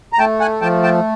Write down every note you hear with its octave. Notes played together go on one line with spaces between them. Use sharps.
A#5
A3 G5 A5
F#5 G#5
F3 G5 A5
G5 A5